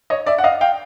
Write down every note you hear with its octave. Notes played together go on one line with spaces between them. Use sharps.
C#5 D#5
D5 E5
F#5
D#5 F5
F5 G5